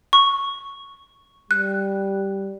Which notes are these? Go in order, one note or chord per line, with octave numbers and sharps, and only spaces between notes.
C#6
G3 F#6